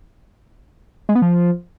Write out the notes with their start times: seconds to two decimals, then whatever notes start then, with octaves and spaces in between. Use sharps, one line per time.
1.09 G#3
1.15 B3
1.22 F3